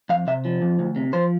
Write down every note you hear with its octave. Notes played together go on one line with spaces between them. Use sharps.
F2 F5
C3 E5
F3
F2
D2
C3
F3 C5